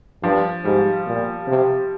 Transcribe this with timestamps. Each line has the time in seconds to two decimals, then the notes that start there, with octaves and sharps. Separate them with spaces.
0.23 G2 F3
0.64 G#2 G3
1.07 A#2
1.48 C3